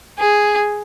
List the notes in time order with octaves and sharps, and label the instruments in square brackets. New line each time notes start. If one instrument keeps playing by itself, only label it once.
[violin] G#4